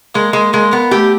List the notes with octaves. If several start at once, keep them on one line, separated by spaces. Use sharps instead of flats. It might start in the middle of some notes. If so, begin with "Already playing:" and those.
G#3 A#3
G#3 A#3
G#3 A#3
A#3 B3
A3 G4